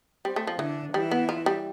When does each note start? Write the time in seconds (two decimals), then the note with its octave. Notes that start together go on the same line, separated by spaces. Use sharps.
0.25 G3 C4
0.36 A3
0.47 F3
0.59 D3 E3 D4
0.94 E3 G3 E4
1.11 B3
1.29 F4
1.46 G3